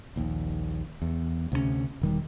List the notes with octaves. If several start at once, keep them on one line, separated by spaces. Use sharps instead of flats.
A#1 D#2
E2
D2 C3 G#3 C#4
E1 D#3 G3